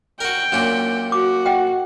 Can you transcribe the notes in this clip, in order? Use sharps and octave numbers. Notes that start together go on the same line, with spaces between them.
F#4 A#4 G5
F#2 A#2 D4
F#4 D6
D#5 F#5 G5